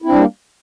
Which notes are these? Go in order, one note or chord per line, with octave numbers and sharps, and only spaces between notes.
G3 A#3 C4 D4 E4